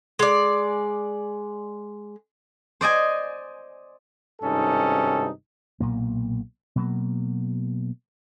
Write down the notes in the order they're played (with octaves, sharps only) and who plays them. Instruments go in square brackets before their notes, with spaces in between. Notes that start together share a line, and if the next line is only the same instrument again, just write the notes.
[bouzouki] G#3 D5
[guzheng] C5 D5 D#5 G#5
[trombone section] G#1 G2 C3 C#4 D#4 A4
[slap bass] B1 A#2 A#3
B2 F#3 A#3